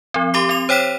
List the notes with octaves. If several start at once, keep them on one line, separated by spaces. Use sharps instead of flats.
F3 C4
G4 C6 D6 C7
C4 F7
C5 C#5 G5 B6 E7